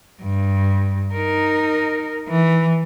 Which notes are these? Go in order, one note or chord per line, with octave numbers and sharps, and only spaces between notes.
G2
D#4 A#4
E3